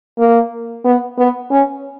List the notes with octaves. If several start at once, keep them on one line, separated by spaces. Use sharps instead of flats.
A#3
B3
B3
C#4